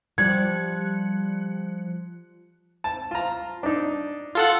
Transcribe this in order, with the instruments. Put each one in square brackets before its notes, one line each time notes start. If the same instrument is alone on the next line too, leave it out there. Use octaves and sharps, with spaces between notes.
[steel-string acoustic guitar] F3 [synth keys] G3 F#6 C#7 [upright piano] G#6
[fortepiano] A5
F4 A#5
D4 D#4
[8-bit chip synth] F4 A4 F#5